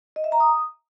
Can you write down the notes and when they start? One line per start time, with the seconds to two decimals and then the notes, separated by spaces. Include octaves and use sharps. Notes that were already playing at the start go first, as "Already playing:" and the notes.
0.16 D#5
0.24 E5
0.32 A#5
0.40 D#6